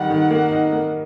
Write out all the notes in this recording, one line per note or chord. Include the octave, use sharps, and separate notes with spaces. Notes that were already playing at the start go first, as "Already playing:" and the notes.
Already playing: D#3 G3 F#5
D#3
A#3
D#4
A#3